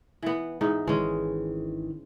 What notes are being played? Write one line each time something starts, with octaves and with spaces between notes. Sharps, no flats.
E3 B3
G#2 E3 D#4
G#1 D#3 E3 G#3 C#4